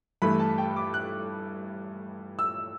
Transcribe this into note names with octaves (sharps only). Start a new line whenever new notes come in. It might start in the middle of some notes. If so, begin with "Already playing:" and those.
G2 E3 A3 B5
A5
G5
D6
F#6
E6